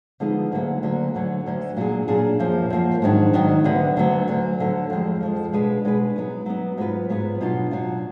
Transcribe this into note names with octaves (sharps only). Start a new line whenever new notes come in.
D3 F3 G#3 B3 D#4
D2 D3 F#3 A#3
D2 D3 F#3 A#3
D2 D3 F#3
D2 D3 F#3
A#2 F#3 D4 G#4
A#2 F#3 D4 G#4
F#2 F3 A#3
F#2 F3 A#3
G#2 D#3 F#3 D4
G#2 D#3 F#3 D4
D2 D3 F#3 B3
D2 D3 F#3 B3
D2 D3 F#3
D2 D3 F#3
F2 F3 G#3
F2 F3 G#3
B2 G#3 D4 G#4 B4
B2 G#3 D4 G#4 B4
F#3 B3 D#4
F#3 B3 D#4
G#2 F#3 B3 F4 B4
G#2 F#3 B3 F4 B4
B2 F#3 D4 F4
B2 F#3 D4 F4